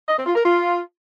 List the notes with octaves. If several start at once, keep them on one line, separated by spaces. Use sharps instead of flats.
D#5
C4
F4
A#4
F4